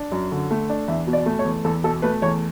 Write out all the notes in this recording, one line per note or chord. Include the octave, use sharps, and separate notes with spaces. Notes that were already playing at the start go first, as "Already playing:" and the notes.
Already playing: D4
F#2
D3
A3
D4
E2 E5
B2
D5
A3
C#5
E2
E2 A4
B2 A4
A3 B4
E2 C#5